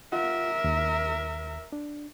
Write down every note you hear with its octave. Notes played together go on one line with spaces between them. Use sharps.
F4 A#4 E5 F#5
D#2
D4